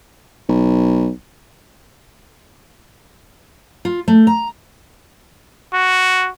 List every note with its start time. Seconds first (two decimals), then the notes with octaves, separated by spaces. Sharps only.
0.49 B1
3.85 F4
4.08 A3
4.27 A#5
5.73 F#4